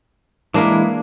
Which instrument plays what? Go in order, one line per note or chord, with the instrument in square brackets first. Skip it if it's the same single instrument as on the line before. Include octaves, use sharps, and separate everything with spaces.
[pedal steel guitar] E3 G#3 E4 [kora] A#3 D4